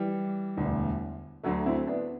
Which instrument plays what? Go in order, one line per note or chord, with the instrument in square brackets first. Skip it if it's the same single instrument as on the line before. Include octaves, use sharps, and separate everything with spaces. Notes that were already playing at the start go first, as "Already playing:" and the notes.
Already playing: [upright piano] E3 G3
[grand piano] E1 D2 D3
[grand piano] D2 D3 A3 [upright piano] F#3
[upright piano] C4 E4
B3 D4